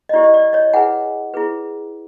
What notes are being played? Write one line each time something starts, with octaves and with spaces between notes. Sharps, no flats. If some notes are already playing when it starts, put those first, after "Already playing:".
D#5
E4 G4 C5 D5
D#5
D5
C#5 D#5
E4 G#4 B4 F#5 G#5
E4 G#4 B4